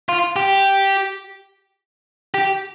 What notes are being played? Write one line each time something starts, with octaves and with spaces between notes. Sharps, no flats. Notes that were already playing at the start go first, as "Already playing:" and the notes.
F4
G4
G4